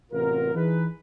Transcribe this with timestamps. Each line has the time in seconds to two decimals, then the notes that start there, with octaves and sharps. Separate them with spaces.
0.12 A1 C3 B3 F4 A#4
0.54 E3 D#4 G#4 B4